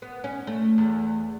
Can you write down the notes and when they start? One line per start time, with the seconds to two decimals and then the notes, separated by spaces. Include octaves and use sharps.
0.02 B3
0.24 C#4
0.47 A3
0.78 E2